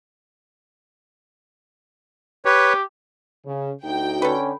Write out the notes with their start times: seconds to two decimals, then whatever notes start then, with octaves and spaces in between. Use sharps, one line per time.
2.45 G4 B4 C#5
3.45 C#3
3.84 D2 D#4 F#4 G5
4.22 D3 C#4 A4 B4